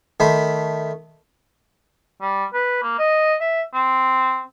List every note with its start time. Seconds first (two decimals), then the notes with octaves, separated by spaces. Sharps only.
0.20 D#3 A3 C5 B5
2.21 G3
2.54 B4
2.82 A#3
2.99 D#5
3.40 E5
3.74 C4